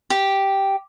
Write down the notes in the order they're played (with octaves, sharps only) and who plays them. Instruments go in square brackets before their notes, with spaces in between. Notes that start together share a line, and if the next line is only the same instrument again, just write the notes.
[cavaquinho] G4